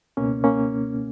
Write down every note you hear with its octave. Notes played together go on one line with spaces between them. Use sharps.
C#2 B2 A#3 C#4
A#3 C#4